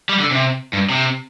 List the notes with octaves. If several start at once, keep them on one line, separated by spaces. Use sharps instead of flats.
G3
D3
C3
G2
C3